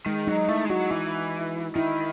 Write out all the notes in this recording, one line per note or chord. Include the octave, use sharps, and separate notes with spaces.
D#3 G#3
F#3 D#4
A3 E4
G#3
F#3 F#4
E3 E4
D#3 E4